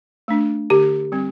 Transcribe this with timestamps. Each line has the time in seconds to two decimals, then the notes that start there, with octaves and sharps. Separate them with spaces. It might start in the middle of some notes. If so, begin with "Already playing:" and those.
0.28 A3 D4
0.70 D3 G4
1.12 G3 C4